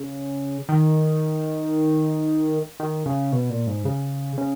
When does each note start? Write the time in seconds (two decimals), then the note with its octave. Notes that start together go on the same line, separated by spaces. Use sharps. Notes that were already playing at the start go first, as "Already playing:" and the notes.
Already playing: C#3
0.69 D#3
2.80 D#3
3.06 C#3
3.32 B2
3.50 A#2
3.67 G#2
3.85 C#3
4.38 C#3